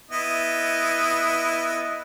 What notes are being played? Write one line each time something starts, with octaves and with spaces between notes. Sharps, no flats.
B3 E4 D#5